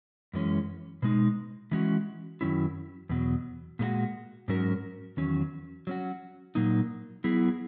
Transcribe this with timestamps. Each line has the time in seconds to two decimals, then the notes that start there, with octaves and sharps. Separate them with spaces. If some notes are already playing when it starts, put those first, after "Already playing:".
0.33 F#2 E3 G#3 C#4
1.02 B2 G#3 D#4
1.71 E3 G#3 C#4 F#4
2.41 F#2 D#3 F#3 C#4 E4
3.09 E2 B2 F#3
3.79 A#2 G#3 D#4 F#4
4.48 G#2 F#3 C#4 F#4 A#4
5.17 E2 D#3 F#3 C#4
5.87 F#3 C#4 F#4
6.55 A#2 F#3 A#3 D#4
7.24 F#3 B3 E4 G#4